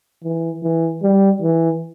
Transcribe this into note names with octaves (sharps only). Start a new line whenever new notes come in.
E3
E3
G3
E3